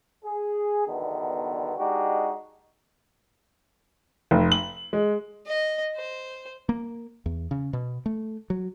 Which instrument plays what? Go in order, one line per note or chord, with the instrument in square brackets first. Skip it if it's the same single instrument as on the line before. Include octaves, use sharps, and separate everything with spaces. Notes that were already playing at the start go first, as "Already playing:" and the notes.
[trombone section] G#4
E2 G2 B2 D3 D#3
G#3 D4 D#4 F#4 G4
[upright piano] F1
F#7
G#3
[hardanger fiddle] D#5
C5
[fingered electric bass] A#3
E2
C#3
B2
A3
F#3